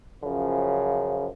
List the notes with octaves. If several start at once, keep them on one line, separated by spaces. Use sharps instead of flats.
F#2 C#3 F3